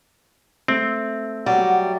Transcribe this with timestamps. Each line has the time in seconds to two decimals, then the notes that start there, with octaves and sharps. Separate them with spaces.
0.68 A3 C4
1.46 F#3 G3 F#5